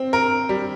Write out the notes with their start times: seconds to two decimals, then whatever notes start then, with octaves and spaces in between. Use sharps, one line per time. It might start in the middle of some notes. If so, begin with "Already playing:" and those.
Already playing: C4
0.13 A#4
0.49 G3